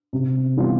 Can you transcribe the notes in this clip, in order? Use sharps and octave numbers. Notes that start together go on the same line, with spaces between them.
C3
E3 G3 B3 F4